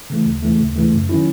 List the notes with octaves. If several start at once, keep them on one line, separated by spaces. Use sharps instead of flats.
C#3 E3 A3
D#2
C#3 E3 A3
D#2
C#3 E3 A3
F#2
D#3 F#3 C#4 E4